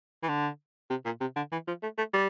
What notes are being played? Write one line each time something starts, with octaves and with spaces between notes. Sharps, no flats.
E3
D3
C3
A#2
C3
D3
E3
F3
A3
A3
G3